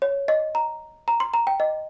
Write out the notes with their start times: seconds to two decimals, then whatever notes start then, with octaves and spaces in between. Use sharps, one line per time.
0.02 C#5
0.28 D#5
0.55 A#5
1.08 A#5
1.20 C6
1.34 A#5
1.47 G5
1.60 D#5